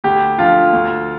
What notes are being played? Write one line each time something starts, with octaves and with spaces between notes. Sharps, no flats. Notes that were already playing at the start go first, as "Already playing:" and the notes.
D2 G4
D3 F3 F4
D2